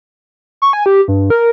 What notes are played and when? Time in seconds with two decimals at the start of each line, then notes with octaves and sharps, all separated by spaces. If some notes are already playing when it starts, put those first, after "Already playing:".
0.62 C#6
0.73 G#5
0.86 G4
1.08 G2
1.30 A#4